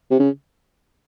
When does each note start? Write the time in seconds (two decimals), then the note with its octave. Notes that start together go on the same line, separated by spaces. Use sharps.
0.11 C3
0.19 C#3